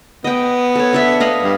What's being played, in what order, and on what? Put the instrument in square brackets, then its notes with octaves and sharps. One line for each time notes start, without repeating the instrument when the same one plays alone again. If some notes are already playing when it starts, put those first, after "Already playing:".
[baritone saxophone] B3 [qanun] D#5 G5
[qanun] A4 C#5
D4 A4 E5
B4 D#5 F5
[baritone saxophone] G2